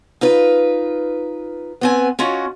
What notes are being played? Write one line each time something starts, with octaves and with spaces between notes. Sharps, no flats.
D#4 F4 B4
B3 C4 G#5
C#4 F4 F#4 D#5